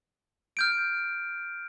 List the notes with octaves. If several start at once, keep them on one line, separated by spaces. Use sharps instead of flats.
F6 G6 D7